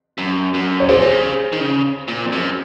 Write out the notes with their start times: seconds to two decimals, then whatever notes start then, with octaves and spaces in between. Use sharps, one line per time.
0.18 F#2
0.54 F#2
0.80 C#5
0.89 A#2 G#4 C5
1.02 C3
1.12 C#3
1.52 D#3
1.60 C#3
2.08 A#2
2.26 F2
2.32 F#2